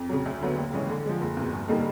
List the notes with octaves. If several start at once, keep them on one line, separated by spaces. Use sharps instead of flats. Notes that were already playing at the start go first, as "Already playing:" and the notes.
Already playing: F2
C#3 F#3
D2
D3 F#3 B3
D#2
C#3 E3 G#3 C#4
D3
F3 G#3
F#1
E2 B2
G2
D3 G3 A#3 D#4